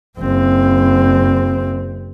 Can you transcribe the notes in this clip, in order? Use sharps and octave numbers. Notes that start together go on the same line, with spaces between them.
F#1 C4